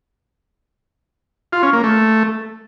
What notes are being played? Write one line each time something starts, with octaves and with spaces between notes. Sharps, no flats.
F4
C#4
A#3
A3